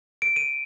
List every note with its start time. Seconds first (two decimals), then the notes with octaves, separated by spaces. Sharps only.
0.22 D7
0.36 D#7